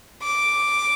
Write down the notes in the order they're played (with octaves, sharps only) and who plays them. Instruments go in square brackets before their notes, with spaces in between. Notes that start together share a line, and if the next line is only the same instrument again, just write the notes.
[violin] D6